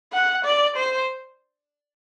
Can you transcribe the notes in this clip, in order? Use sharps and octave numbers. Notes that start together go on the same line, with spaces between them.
F#5
D5
C5